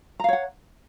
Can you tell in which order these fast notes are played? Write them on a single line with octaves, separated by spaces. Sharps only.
A#5 F5 C#5 F#5